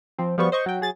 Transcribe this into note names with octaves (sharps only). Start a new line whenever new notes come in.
F3 C4
F3 G3 B3 F#4 C#6
C5 D#5 C#6
F#3 G5
F#3 G#4 A6